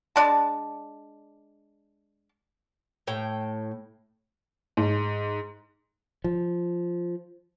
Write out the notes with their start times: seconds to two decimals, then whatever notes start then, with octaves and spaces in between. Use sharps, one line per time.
0.16 G#3 D4 A5
3.07 A2 G5
4.77 G#2
6.24 F3